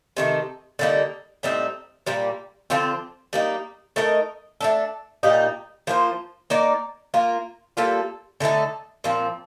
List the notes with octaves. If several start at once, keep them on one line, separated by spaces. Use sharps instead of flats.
C3 D#3 A3
D3 G3 A#3 D#4
A2 G3 C4 D#4
A#2 G3 A#3
D3 F3 C4 F4
G3 A#3 D#4
A3 D#4 A#4 D#5
A3 D4 A4
A#2 G3 A#3 D#4
F3 A#3 F4 C5
A#3 D#4 A#4 D5
A#3 F4 A#4
G3 A#3 F4 A4
D3 A3 D#4 A4
A#2 F3 C4